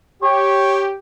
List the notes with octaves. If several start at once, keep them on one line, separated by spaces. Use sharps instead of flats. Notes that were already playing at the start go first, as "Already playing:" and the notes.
G4 C#5